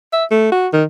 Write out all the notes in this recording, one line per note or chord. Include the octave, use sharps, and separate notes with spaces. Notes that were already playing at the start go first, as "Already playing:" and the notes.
E5
A3
F#4
D#3